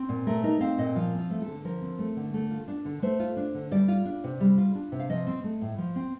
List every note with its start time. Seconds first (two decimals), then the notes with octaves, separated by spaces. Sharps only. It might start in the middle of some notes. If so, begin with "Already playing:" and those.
Already playing: C4
0.09 A#2
0.27 A3 A#4
0.44 D#4 A#4
0.61 C4 F5
0.78 A#2 D#5
0.95 F3 F4
1.13 C4
1.18 F4
1.30 A3
1.42 A4
1.48 D3
1.65 F3 A#4
1.82 C4
1.99 A3
2.17 D3
2.34 A3
2.51 F4
2.68 D4
2.85 D3
3.02 A3 C5
3.20 F4
3.37 D4
3.55 D3
3.71 G3 D5
3.88 F4
4.06 D4
4.24 C3
4.40 G3
4.58 F4
4.75 D4
4.92 C3
4.99 F5
5.10 F3 D#5
5.27 C4
5.44 A3
5.61 A2
5.78 F3
5.96 C4